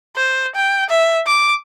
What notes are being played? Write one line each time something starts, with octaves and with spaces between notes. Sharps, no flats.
C5
G5
E5
D6